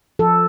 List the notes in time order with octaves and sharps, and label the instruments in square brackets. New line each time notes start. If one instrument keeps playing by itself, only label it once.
[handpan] F3 A4